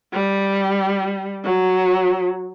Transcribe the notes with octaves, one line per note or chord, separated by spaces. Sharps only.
G3
F#3